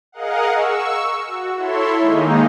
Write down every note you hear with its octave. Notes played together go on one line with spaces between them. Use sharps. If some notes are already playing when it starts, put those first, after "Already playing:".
G#4 A#4 D#5 F5 F#5
C#6 E6
F#4
E4 A4 C#5 E5 C6
D#3 G#3 A#3 D#4